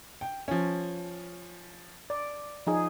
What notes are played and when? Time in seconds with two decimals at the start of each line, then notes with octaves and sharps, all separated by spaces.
0.21 G5
0.48 F3 C#4
2.10 D5
2.67 F3 D#4 G#4